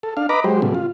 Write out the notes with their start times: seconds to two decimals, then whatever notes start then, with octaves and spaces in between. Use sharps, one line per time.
0.03 A4
0.17 D4 F5
0.29 B4 D#5 A#5 B5 D6
0.44 F#3 G#3 G4 C5
0.62 A2 C#3 F#3 G3 B3
0.74 F4